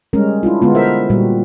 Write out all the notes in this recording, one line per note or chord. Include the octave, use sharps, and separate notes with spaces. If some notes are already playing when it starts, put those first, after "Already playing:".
G3 G#3 C#4 A#4
D4 E4 F4
D3 G#3 B3 F4
A#4 C5 E5
A#2 G3 F#4